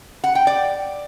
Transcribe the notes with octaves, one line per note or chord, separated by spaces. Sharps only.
F#5
G5
D5